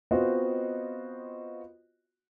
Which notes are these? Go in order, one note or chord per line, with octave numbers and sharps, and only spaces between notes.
B3 C4 F4 F#4 C5 D#5